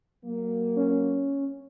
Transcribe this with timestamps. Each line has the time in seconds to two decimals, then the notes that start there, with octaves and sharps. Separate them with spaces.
0.23 F#3 A#3
0.76 C#4